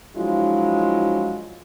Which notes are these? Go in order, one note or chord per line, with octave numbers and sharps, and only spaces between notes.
F3 F#3 G#3 D4 E4 F4